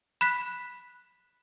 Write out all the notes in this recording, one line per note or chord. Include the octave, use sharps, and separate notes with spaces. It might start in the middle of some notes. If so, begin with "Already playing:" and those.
B5 F#6 B6